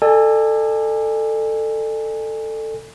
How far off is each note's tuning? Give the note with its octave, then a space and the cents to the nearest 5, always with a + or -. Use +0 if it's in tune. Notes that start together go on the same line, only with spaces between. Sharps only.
A4 +10 D5 +40 G#5 -20